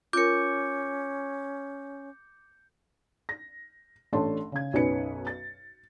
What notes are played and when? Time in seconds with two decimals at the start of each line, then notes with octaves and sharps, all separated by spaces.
0.13 C#4 F4 A#4 D6 G6 C#7
3.29 A#6
4.13 A1 A3 D4 C#5 A5 C6
4.52 C#3 G#6
4.73 B1 F#2 C#4 D#4 B4 C#7
5.27 A6